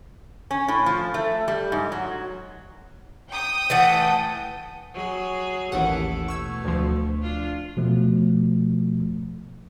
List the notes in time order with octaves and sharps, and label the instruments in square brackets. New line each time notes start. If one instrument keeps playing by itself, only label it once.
[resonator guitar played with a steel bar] C#4
A2
F3
A3
G3
G#2
F#3
[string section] G5 D#6
[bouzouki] E3 A3 F#5
[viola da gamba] F#3 G#4
[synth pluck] A1 D#2 F#5 [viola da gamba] E3 E4 A4
[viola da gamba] B2 A3 [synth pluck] C#6 E6 G#6
[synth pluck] D2 F3
[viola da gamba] D4 F4
[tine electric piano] B2 F3 A3